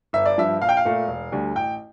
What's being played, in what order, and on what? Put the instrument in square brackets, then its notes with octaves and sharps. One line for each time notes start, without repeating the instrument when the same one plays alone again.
[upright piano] G1 E5
D5
G2 F3 E5
A#1 F5
G5
F5
A#2 A3
E1
D2 D3 G3
A1 G5